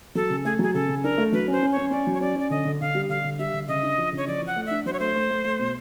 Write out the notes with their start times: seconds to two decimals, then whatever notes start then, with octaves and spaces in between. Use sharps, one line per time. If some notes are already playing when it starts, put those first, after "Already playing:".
0.15 F#3 A4
0.30 C#3
0.45 A3 G#4
0.59 F#3 G#4
0.74 C#3 A4
0.89 C#3
1.03 D4 A#4
1.18 A3
1.32 F#3 B4
1.48 C#4 C5
1.62 C#4
1.72 C#5
1.77 C#4
1.91 C#4 D5
2.07 F#3
2.13 C#5
2.21 C#4 D5
2.36 C#4 D5
2.50 D3 D#5
2.65 D3
2.81 D3 F5
2.95 G3
3.09 D3 F5
3.24 D3
3.39 G3 E5
3.53 D3
3.68 C#3 D#5
3.83 D4
3.98 F3
4.12 C#3
4.17 C#5
4.27 F3 D5
4.42 F3
4.47 F#5
4.56 A3
4.66 D4 E5
4.86 F#3 C5
4.93 C#5
5.00 A3 C5
5.16 A3
5.31 A3
5.45 A3
5.59 B2